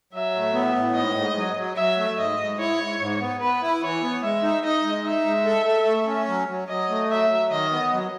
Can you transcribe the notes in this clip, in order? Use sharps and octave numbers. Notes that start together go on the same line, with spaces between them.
F#3 E5
A2
B3
A2
G#2 D#5
G#2
F#3
F#3
F#3 E5
A3
G#2 D#5
G#2
E4 C#5
G#2
G#2
B3
B3 B4
E4
E3 C#5
B3
G#3 E5
D#4
D#4 D#5
G#3
D#4 E5
G#3
A4
A4
A3
C#4
F#3
F#3
F#3 D#5
A3
F#3 E5
F#3
D#3 D#5
B3
F#3